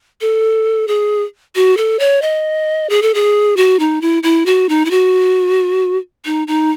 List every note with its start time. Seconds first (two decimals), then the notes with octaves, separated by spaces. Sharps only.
0.21 A4
0.88 G#4
1.55 F#4
1.77 A4
1.99 C#5
2.22 D#5
2.90 G#4
3.02 A4
3.14 G#4
3.57 F#4
3.79 D#4
4.01 E4
4.23 E4
4.46 F#4
4.69 D#4
4.85 E4
4.91 F#4
6.25 D#4
6.47 D#4